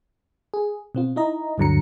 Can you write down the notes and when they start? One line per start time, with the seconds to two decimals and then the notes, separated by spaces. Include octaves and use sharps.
0.54 G#4
0.95 B2 C4 F4
1.16 D#4 E4 D#5 A#5
1.58 D2 G2 D3 F#3 A#5 C#7